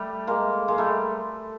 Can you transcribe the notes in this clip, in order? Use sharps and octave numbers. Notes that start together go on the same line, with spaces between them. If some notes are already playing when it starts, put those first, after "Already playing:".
Already playing: G3 A3
G#3 A#3
G#3 A#3
G3 A3